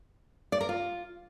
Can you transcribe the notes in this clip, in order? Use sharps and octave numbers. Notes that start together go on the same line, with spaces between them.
D5
A#4
F4